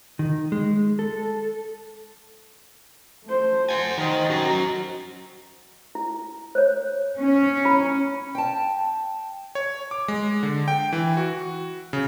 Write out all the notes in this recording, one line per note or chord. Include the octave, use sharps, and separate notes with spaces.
D#3
G#3
A4
A3 C5
F#5 G#5
D#3 C5 D#5
F#3 C#4
E4
C5 C#5
C#4
E4 B5
G5 A5
C#5
D6
G#3
D3
G5
E3
F#4
C#3